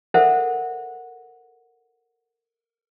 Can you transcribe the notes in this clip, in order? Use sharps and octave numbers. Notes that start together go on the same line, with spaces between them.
A4 A#4 C5 E5 F#5